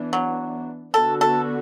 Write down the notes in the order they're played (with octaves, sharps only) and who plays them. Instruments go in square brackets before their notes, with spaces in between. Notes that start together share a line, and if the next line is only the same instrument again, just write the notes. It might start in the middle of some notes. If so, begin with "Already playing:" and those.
Already playing: [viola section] E3 B3 D4
[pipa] F#3
[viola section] D3 B3 F#4 [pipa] A4
[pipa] A4